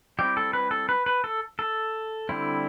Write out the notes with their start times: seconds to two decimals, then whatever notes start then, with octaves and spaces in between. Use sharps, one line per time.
0.19 G3 C4 E4 G4
0.37 A4
0.53 B4
0.71 A4
0.89 B4
1.06 B4
1.24 A4
1.59 A4
2.29 D3 G3 C4 E4